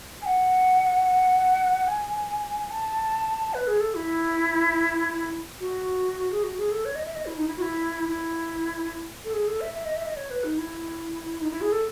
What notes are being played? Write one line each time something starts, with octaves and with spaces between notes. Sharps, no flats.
G#5
F#5
G#5
A5
B4
G#4
A4
E4
F#4
G#4
F#4
G#4
A4
C#5
D#5
E5
D#5
E4
D#4
E4
F#4
E4
E4
A4
G#4
A4
E5
E5
D#5
E5
D#5
C#5
B4
D#4
E4
D#4
E4
G#4
A4